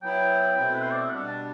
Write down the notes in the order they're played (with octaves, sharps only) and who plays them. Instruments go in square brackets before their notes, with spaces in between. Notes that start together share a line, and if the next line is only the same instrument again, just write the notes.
[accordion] F#3 B3 E4 [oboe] G5
[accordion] B2 A3 C4 E4
[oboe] B4
C5
D5
E5
[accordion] B2 G3 D4 [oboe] F#5
[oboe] A5